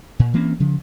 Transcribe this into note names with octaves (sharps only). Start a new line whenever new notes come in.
A#2
E3 A#3 C4 C#4
C#3 F3